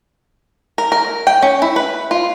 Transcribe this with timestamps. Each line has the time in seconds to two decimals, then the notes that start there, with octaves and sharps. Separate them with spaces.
0.78 A#4
0.92 A#4
1.27 G5
1.42 C#4
1.62 E4
1.76 B4
2.11 F4